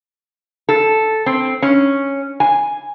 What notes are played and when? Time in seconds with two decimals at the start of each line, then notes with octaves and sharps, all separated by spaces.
0.69 A4
1.26 C4
1.62 C#4
2.40 G#5